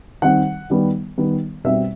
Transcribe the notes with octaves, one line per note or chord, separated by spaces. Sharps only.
D#3 G3 C4 F#5
D#3 G3 B3
D#3 G3 B3
B2 G3 C4 E5